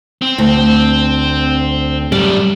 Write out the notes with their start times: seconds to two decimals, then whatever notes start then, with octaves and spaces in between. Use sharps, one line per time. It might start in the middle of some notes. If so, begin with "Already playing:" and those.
0.22 C4
0.38 D2
2.12 F#2 G3 D4